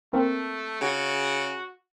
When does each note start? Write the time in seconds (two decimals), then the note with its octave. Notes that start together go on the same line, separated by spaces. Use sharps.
0.13 A3 A#3 C4 A#4
0.81 C#3 F#4